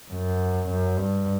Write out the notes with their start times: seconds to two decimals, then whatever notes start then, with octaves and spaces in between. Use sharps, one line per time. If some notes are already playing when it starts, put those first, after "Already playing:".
0.11 F#2
0.69 F#2
0.97 G2